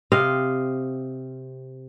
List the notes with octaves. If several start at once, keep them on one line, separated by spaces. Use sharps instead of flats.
C3 C4 D#5 F5